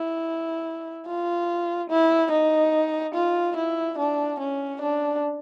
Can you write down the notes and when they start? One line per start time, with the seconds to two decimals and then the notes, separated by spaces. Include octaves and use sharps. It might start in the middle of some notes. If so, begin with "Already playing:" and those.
Already playing: E4
1.07 F4
1.90 E4
2.31 D#4
3.15 F4
3.56 E4
3.98 D4
4.39 C#4
4.81 D4